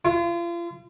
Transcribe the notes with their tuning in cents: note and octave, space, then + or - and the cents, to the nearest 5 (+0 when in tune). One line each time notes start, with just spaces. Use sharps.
F4 -35